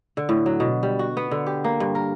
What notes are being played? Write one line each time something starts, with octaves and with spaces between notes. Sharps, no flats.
D3
A2
F#3
B2
G3
F#4
B3
D3
G4
A#3
G2
A#4